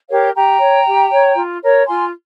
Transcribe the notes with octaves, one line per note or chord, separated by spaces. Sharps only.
G4 A#4 C#5 F5
G4 G5 A#5
C#5
G4
C#5
F4
A#4 C#5
F4 G#5 C6